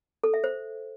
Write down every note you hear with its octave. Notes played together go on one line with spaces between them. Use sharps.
A4
E5
C5